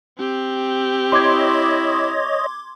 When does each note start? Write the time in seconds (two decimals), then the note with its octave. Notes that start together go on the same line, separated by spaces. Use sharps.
0.18 C4 G4
1.12 E4 C#5 D#5 C6 D6 G#6